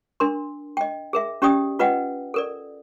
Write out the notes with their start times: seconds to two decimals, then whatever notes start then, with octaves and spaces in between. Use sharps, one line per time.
0.20 D4 A#4 C6
0.77 D#5 G5
1.13 G#4 A#4 E5
1.42 C#4 G4 D5 G5 D#6
1.79 F4 B4 D#5 F#5 G5
2.34 A4 A#4 D5